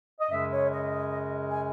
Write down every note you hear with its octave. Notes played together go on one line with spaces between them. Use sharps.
D#5
F#2 C#3 G#3 E5
C#5
D#5
G#5